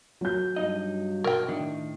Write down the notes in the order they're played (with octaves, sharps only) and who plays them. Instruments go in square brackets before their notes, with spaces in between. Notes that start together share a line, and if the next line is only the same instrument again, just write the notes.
[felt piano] F#3 G6
[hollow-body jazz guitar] G2 D#4 D#5
[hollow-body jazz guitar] B1 [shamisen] A#4 G5
[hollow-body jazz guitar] A2 D#3 D4